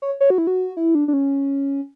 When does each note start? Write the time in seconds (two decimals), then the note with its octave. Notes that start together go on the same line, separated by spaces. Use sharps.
0.02 C#5
0.20 C#5
0.30 F#4
0.38 E4
0.47 F#4
0.77 E4
0.95 D4
1.08 D4
1.13 C#4